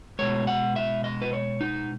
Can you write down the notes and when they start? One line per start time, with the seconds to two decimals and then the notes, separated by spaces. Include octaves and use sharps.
0.19 B2 G#3 C#5
0.47 F#5
0.76 E5
1.04 D#5
1.22 B4
1.33 C#5
1.61 D#4